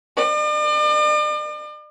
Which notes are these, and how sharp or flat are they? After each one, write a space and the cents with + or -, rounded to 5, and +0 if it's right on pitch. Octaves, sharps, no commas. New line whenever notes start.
D5 +45